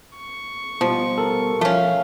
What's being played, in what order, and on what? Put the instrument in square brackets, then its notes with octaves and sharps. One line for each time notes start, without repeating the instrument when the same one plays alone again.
[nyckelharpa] C#6
[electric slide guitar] B2 G3 [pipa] F3
[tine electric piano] A4 A#4
[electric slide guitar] F3 [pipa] A3 C#4 [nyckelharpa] F5